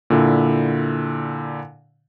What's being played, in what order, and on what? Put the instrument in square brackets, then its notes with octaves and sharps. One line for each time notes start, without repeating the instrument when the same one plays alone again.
[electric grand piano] A#2 D3 E4